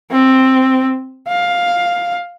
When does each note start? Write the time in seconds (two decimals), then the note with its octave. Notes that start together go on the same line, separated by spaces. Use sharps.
0.11 C4
1.28 F5